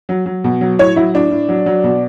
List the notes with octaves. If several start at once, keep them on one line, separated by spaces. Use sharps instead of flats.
F#3
F#3
B2
F#3
A2 C#5
F#3 E4
A2 D4
A2
F#3
F#3
B2